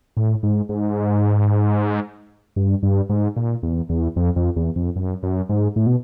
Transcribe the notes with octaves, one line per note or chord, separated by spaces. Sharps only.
A2
G#2
G#2
G2
G2
G#2
A#2
E2
E2
F2
F2
E2
F2
F#2
F#2
G#2
A2
B2